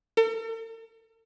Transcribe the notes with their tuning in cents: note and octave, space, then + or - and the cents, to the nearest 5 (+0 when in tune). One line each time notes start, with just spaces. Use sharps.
A4 +45